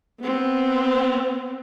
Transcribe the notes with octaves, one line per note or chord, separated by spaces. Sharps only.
B3 C4